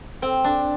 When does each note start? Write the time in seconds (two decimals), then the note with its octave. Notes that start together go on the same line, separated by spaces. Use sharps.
0.22 C4
0.44 D4